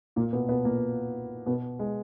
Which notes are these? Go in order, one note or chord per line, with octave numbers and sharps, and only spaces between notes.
A#2 A#3
B2 B3
B2 B3
A#2 A#3
B2 B3
G#3